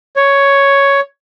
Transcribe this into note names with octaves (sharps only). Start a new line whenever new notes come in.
C#5